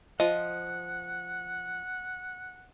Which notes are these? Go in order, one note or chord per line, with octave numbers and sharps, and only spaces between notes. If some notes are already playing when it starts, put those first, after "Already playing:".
F3 D#5 F#5